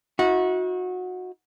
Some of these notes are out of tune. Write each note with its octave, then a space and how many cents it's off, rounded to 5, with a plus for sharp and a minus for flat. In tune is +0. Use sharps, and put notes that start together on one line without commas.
D#4 +45 F#4 -20